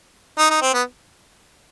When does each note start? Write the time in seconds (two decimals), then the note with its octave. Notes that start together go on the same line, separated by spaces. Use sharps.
0.38 D#4
0.50 D#4
0.62 C4
0.74 B3